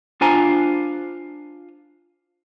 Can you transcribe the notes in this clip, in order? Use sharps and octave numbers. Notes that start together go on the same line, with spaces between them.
D4 F4 C5 G#5 A#5